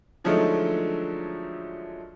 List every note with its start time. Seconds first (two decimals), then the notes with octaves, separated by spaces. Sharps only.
0.24 D3 F3 F#3 G#3 A3 D#4